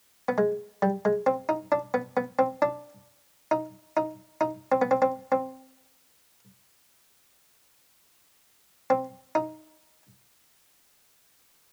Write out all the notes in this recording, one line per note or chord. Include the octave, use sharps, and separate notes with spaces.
B3
G#3
G3
G#3
C4
D#4
D4
B3
B3
C4
D4
D#4
D#4
D#4
C4
B3
C4
C4
C4
C4
D#4